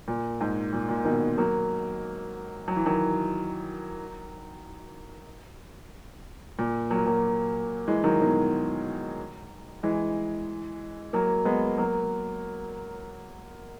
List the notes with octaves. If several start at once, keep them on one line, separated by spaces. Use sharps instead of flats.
A#2
G#2
A#2
A#2
B2 D#3
F#3 A#3
F#3
E3
D#3 F#3
A#2
F#3 A#3
F#3 A#3
E3 G#3
D#3 F#3
B2 D#3
E3 G#3
F#3 A#3
G#3 B3
F#3 A#3